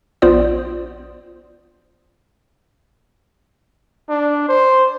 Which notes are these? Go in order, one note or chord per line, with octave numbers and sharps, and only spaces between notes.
A#1 B3 F4 C5 D5 D#6
D4
C5